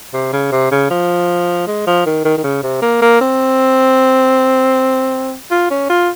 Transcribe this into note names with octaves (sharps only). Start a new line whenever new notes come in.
C3
C#3
C3
C#3
F3
G#3
F3
D#3
D#3
D#3
C#3
C3
A#3
A#3
C4
F4
C#4
F4